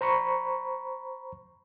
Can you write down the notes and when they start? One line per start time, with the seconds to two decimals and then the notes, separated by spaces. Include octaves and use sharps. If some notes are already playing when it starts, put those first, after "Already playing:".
0.01 C5 A#5 B5 C#6